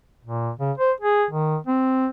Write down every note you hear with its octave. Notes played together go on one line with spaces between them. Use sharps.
A#2
C#3
C5
G#4
D#3
C4